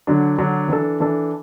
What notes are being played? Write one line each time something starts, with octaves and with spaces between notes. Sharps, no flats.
D3 F#3 D4
D3 F#3 D4
E3 D4 A4
E3 D4 A4